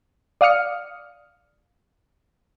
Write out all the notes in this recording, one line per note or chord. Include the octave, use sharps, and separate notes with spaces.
D5 F5 D#6 F6 C#7